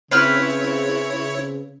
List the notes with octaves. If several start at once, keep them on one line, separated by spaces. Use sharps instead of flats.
C#3 C4 E4 B4 C#5 F6